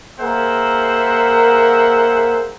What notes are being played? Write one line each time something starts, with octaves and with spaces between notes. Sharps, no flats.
A#3 G#4 A#4 C5 E5 F#5